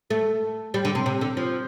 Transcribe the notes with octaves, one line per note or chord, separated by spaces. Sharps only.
A3
G3
D3
C3
C3
D3
F3